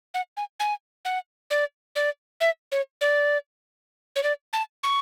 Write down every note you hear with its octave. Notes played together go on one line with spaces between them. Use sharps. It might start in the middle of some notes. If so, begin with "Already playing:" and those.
F#5
G#5
G#5
F#5
D5
D5
E5
C#5
D5
C#5
D5
A5
C#6